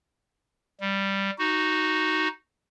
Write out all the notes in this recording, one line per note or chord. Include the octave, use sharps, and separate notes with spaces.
G3
D#4 F#4